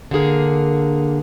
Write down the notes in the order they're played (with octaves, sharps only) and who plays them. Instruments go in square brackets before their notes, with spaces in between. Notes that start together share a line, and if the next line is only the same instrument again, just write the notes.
[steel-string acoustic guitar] D3 A#3 G#4 A#4